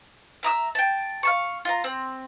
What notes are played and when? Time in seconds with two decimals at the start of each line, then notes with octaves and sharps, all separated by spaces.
0.43 E5 A#5 D#6 E6
0.75 G5 A5
1.23 F5 A5 C#6
1.65 F4 A#5
1.84 C4